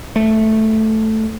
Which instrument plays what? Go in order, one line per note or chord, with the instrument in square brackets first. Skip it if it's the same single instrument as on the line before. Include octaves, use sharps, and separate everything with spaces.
[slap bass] A3